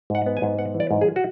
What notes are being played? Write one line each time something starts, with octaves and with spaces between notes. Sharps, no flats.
G#2 F#5
B3
G#5
G#2
B3 F#5
E3
D5
G#2
G#4
F#4